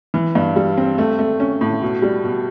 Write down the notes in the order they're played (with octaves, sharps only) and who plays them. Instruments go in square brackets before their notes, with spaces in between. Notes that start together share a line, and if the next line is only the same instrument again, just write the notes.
[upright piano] E3
G2
G3
C4
A3
A3
C#4
A2
B2
G3
B2